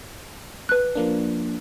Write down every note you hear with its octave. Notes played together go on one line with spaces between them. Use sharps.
B4 F#6
F3 A#3 D4